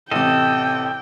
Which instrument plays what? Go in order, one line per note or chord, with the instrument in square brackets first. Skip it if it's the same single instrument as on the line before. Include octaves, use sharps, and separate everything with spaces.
[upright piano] A1 C3 [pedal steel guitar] A4 D#5 [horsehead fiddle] G5